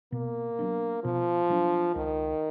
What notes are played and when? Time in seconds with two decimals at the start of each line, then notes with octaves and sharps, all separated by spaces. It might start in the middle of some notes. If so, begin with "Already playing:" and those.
0.12 B2 A#3
0.59 F#3 B3 D4
1.03 B2 F3
1.50 F#3 B3 D4
1.95 C#2 D#3